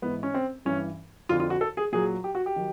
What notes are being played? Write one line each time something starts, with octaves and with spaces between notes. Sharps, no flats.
G#2 E3 B3
C#4
C4
G2 E3 C#4
F2 D3 F3 F4
F4
F#4
A4
G#4
A#2 F#3 G#4
G4
F#4
G4
D#3 F#3